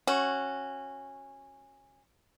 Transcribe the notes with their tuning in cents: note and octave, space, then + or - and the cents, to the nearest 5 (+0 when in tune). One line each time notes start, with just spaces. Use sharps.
C#4 -15 F#4 -5